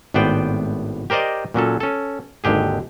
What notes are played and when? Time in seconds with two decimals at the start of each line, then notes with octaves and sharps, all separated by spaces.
0.14 G#1 A2 B3 C5 D5 G5
1.10 G4 A#4 C5 D5 D#5
1.54 A#2 F#3 C#4 A4
1.80 C#4 A4
2.44 G#1 D#2 D3 G4 G#4